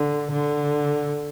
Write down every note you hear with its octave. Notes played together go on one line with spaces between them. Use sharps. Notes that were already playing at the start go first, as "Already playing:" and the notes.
Already playing: D3
D3